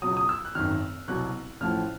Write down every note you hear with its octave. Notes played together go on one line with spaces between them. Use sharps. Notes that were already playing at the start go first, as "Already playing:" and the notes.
C#2 B2 F#3 D#6
D#6
E6
F#6
G#1 F#2 D#3 F6
C2 B2 F#3 F#6
A1 A2 F3 F6